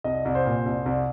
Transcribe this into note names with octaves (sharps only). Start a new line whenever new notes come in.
C2 D#5
C2
C5
A#2
C2
C2